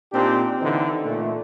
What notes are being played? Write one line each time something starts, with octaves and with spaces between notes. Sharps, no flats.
A#2 C4 D4 D#4 G4
D3 E3 C4 D#4
A#2 A3